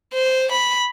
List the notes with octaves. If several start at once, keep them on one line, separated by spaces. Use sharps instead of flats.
C5
B5